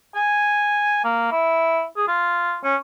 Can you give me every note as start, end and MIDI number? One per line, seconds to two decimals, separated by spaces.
0.15 1.03 80
1.04 1.27 58
1.31 1.84 64
1.96 2.05 68
2.08 2.58 65
2.64 2.75 61